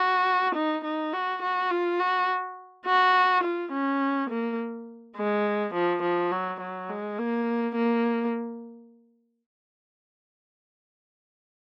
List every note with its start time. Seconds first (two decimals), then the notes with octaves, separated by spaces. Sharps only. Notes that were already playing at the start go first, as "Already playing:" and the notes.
Already playing: F#4
0.55 D#4
0.84 D#4
1.13 F#4
1.42 F#4
1.71 F4
2.00 F#4
2.86 F#4
3.43 F4
3.72 C#4
4.30 A#3
5.17 G#3
5.74 F3
6.03 F3
6.31 F#3
6.60 F#3
6.89 G#3
7.18 A#3
7.75 A#3